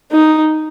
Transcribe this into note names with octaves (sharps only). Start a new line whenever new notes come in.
D#4